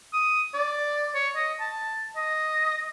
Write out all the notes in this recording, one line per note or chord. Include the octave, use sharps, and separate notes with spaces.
D#6
D5
C#5
D#5
A5
D#5